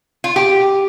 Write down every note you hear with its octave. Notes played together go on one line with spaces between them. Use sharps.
F4
G4